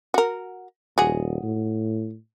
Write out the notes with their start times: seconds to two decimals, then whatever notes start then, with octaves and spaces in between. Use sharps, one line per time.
0.14 F#4 A#4
0.98 D#1 F#4 G#4
1.43 A2